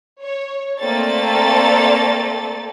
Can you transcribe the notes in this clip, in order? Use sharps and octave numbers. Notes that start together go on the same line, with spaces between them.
C#5
A3 A#3 C4 A4 D5 A6